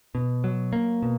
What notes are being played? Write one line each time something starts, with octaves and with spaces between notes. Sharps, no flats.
B2
F#3
A#3
B2